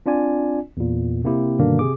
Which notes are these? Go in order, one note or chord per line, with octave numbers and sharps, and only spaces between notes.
C4 D4 F4 D5 G#5
E2 A#2
C3 A#3 C4 E4 G4
G2 B2 D3 D#3 A#3 D4
C3 G#4 D6